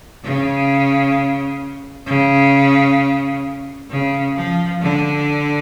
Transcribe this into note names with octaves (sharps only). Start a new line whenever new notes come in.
C#3
C#3
C#3
F3
D3